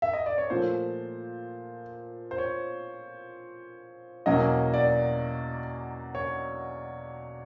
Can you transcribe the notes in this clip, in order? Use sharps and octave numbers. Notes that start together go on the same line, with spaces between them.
E5
D#5
D5
C#5
A#2 F3 A3 C5
C5
C#5
E2 B2 F#3 A#3 C#4 D#5
D5
C#5